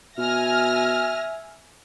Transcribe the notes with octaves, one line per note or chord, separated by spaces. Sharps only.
B2 E5 G#5 F6 A#6